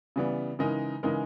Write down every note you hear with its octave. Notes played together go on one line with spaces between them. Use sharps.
C#3 E3 G3 B3
C#3 E3 G#3 D#4 A#4
C#3 E3 G#3 D#4 A#4